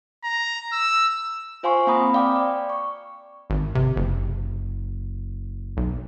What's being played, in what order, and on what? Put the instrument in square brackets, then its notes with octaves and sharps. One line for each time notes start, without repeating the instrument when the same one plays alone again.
[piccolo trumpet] A#5
E6
[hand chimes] F4 C5 F5 G#5 C6 C#6
A#3 C4 F5 A#5 B5 D#6
D5 F5 G5 D6
D5
C#6
[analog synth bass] G#1
C3
F#1
B1